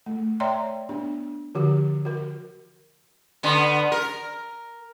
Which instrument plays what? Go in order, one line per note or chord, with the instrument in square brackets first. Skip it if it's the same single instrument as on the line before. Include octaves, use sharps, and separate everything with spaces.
[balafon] A3
C#5 D5 E5 G5 A#5 C6
B3 D4
D3 F3 F#4 G4
F#4 A#4
[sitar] D3 B3
A#4